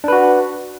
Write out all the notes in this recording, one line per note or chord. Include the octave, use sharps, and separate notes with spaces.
D4 F#4 B4